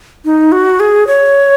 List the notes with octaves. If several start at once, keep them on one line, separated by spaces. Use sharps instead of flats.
D#4
F#4
G#4
C#5